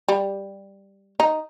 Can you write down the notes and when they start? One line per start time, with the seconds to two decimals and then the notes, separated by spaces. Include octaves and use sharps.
0.08 G3
1.20 D#4